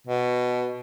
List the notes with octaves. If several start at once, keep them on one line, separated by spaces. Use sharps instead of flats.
B2